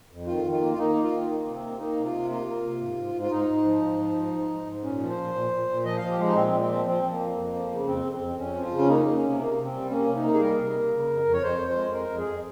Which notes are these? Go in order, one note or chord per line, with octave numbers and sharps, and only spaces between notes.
F2
D#3 F4
D#3
F4
A#3
F4
A#3 D#4
A#3
F4
D#3
A#3
C3
C4
A#3
A#3 D#4
C3
F4
C3
A#3 F4
A#3
C3
G#2
G#2
G#2
F4
G#2 D#4
G#2
F3
G#2
F3
G#2
G#2
G#2
G#2
A#2 C#4
F3
C5
A#2
A#2
A#2
A#2
F3 D#5
F3 F5
G4
G#3 D#4
A#2 C4
A#2
C4
F3
F3 C4
F3
A#3
F2
F2
F3
C#3
F2 C4
F2
C4
F2
F2 C#4
F3
F4
C#3
C#4
A#3 D#4
A#3
C#4
C3
A#3
C3
C4
G3
A#3 C#4
C3
D#4
A#3
G#4
G3 A#4
C3
A#3
C#3
F2
F2
C#5
F2 C5
F2
C5
G#3
F2 A#4
F2
G#4
F2